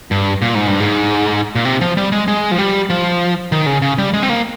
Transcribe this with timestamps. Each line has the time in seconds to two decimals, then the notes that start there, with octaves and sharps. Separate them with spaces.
0.11 G2
0.42 A#2
0.55 G#2
0.67 G2
0.80 G#2
1.55 A#2
1.65 C3
1.81 F3
1.97 G3
2.12 G#3
2.28 G#3
2.51 F3
2.58 G3
2.90 F3
3.52 D#3
3.66 C#3
3.82 C#3
3.98 G3
4.13 G#3
4.23 C4
4.30 A#3